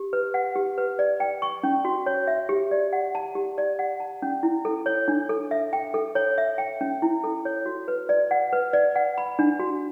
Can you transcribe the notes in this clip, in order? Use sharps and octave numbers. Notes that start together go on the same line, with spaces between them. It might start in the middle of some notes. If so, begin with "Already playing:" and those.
Already playing: G4
B4
F#5
G4
B4
D5
G5
C#6
C#4
F#4
C#5
E5
G4
D5
F#5
A5
G4
D5
F#5
A5
C#4
E4
A4
C#5
D4
A4
E5
G5
A4
C#5
E5
G5
C#4
E4
A4
C#5
F#4
B4
D5
F#5
B4
D5
F#5
B5
D4
F#4